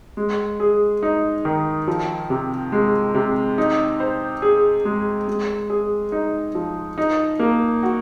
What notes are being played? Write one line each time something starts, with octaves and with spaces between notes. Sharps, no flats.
G#3
G#4
D#4
D#3
F3
C3
G#3
C3
D#4
C5
G#4
G#3
G#3
G#4
D#4
F3
D#4
A#3
F#4